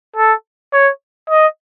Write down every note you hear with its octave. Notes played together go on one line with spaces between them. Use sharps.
A4
C#5
D#5